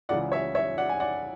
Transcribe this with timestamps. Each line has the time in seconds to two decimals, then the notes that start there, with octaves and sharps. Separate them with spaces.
0.09 C#2 C#3 E3 D5 F#5
0.32 C#5 E5
0.55 C#5 E5
0.78 D5 F#5
0.89 G#5
1.00 D5 F#5